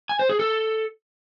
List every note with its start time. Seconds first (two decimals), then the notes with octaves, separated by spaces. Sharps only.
0.09 G#5
0.19 C5
0.29 G#4
0.39 A4